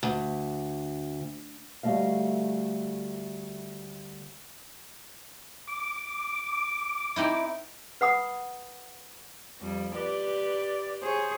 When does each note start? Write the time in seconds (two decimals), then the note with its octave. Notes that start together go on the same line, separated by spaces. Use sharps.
0.03 D2
1.83 D2 G3 A3 D#5 F5
5.67 D6
7.16 C4 D#4 E4
8.01 B4 F#5 B5 D#6
9.61 F2 G3
9.96 G4 B4 D5
11.02 G#4 C5 C#5